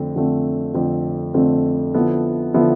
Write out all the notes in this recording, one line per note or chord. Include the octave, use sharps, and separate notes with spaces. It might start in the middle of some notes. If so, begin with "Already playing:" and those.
Already playing: F2 D3 A3 C4
F2 D3 A3 C4
F2 D3 A3 C4
F2 D3 A3 C4
D3 F3 B3 E4 A4
D3 F3 B3 E4 A4